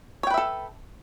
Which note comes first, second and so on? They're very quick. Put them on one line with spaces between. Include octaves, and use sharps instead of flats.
C#5 G5 B4 E5 A4